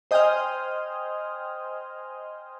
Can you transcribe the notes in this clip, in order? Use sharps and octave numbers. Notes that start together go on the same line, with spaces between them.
C5 D#5 G5 G#5 D#6 F6